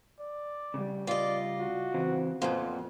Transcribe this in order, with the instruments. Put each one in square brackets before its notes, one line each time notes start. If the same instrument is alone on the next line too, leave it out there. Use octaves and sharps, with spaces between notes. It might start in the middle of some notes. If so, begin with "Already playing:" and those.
[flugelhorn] D5
[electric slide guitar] C#3 G3
[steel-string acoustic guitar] F4 D#5 [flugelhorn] D5
[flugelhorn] F#4
[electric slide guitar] C#3 E3 C4
[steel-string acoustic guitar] F2 A#2 [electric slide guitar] F3 A#3 F4 [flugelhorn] B3